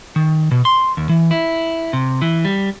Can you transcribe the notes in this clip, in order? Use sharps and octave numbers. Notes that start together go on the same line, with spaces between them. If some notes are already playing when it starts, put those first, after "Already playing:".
D#3
B2
C6
D#2
E3
E4
C3
E3
G3